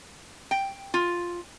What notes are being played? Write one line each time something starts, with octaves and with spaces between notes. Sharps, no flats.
G5
F4